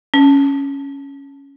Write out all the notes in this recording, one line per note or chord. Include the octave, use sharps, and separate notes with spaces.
C#4